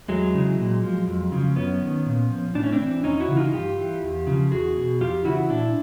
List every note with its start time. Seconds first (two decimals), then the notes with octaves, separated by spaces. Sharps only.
0.08 E2 F#3 G#3
0.34 C#3 E3
0.58 A#2
0.83 F3
1.07 F2
1.32 C#3 F3
1.56 F#2 B3 C#4
1.82 D#3
2.06 A#2
2.30 F3
2.55 A2 D4
2.64 C#4
2.72 C4 D4
2.80 E3
3.04 E2 C#4 D#4
3.20 E4 F#4
3.28 C#3 E3
3.37 D#4 F4
3.53 G2 F4 G4
3.78 E3
4.03 E2
4.27 C#3 F3
4.51 E2 F#4 G#4
4.76 B2
5.00 F2 F4 G4
5.25 C#3 E3 E4 F#4
5.49 A#2 D4 E4